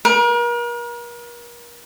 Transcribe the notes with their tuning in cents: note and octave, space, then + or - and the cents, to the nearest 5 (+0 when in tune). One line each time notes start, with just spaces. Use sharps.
A#4 +40